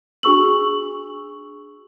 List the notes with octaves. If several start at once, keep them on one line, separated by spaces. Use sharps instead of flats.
D4 F#4 G#4 C#6 E6 F#7